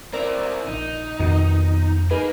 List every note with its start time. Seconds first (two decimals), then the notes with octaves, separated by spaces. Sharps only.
0.13 C4 E4 A#4 D5 E5
0.68 A#1 D#4
1.19 F2 B2 D#3
2.11 A#3 D#4 G#4 B4